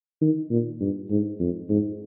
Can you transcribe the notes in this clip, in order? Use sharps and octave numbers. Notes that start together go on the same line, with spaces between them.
D#3
A#2
G2
G#2
F2
G#2